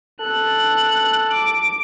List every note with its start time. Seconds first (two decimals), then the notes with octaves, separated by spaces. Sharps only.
0.21 A4 F#6
1.32 D6